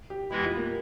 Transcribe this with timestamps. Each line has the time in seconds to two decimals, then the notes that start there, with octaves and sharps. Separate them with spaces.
0.10 G4
0.31 E2 E3 G#3 E4 G4
0.44 F4
0.57 A#3